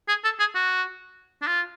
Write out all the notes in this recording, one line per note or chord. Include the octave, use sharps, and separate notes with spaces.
G#4
A4
G#4
F#4
D4
F4